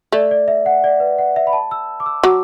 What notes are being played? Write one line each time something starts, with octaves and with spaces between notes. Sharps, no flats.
A3 D5
D5
E5
F#5
D5
B4
F#5
E5
B5
A5
E6
D6
E6
F#3 D6